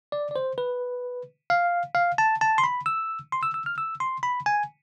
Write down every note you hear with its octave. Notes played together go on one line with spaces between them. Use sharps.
D5
D5
C5
B4
F5
F5
A5
A5
C6
B5
E6
C6
E6
E6
F6
E6
C6
B5
G#5